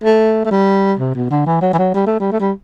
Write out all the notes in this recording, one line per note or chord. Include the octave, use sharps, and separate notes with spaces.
A3
A3
G3
C3
B2
D3
E3
F#3
E3
F#3
G3
A3
G3
A3
G3